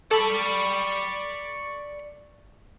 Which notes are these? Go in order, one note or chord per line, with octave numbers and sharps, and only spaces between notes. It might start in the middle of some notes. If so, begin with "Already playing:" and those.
A4 D5 B5 C#6